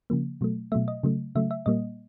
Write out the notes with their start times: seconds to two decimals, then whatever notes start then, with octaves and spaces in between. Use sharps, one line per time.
0.10 C#3 F3 A#3
0.41 B2 F#3 A3
0.72 B2 F#3 A3 E5
0.88 D#5
1.03 C#3 F#3 A3
1.35 C#3 F#3 A3 E5
1.51 E5
1.66 A#2 G3 A#3 D#5